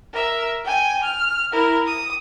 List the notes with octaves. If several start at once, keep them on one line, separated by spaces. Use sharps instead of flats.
A#4 E5
G5 G#5
F6
E4 A#4
D#6